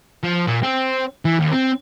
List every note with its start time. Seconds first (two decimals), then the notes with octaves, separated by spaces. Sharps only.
0.23 F3
0.47 A#2
0.63 C4
1.25 E3
1.39 D#2
1.52 C4